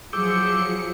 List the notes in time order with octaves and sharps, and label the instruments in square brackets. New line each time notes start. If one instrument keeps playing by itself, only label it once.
[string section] F3 F#3 C#7 [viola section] G#4 [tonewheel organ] D6 E6 G6